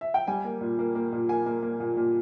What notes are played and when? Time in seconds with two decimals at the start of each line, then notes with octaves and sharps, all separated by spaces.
0.01 E5
0.14 G5
0.27 G3 G#5
0.44 A#3
0.61 A#2
0.79 A#3
0.95 A#3
1.12 A#2
1.29 A#3 G#5
1.46 A#3
1.62 A#3
1.80 A#2
1.97 A#2